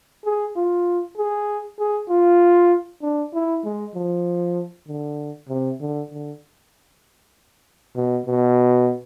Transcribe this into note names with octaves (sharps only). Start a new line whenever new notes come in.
G#4
F4
G#4
G#4
F4
D4
E4
G#3
F3
D3
C3
D3
D3
B2
B2